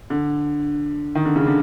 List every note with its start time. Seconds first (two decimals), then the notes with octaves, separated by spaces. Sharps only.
0.10 D3
1.15 D#3
1.25 D3
1.36 C#3
1.47 D3